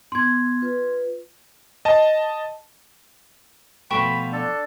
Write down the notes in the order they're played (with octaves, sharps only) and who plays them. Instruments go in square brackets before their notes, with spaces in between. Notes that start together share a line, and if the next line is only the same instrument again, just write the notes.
[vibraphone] B3 [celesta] C6 G#6
[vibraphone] F4 B4
[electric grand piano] D#5 A5
[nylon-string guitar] B2 F3 A3 [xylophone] G5 C#6 E7 [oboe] B5
[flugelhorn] D4 [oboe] A4